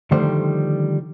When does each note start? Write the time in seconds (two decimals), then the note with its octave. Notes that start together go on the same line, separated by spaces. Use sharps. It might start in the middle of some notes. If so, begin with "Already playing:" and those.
0.11 D3 D#3 F3 G3 A3 C5